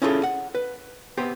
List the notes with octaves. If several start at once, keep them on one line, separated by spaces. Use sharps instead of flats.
C#4 E4 F4 G#4 A4 C#5
F#5
B4
B3 G4 C5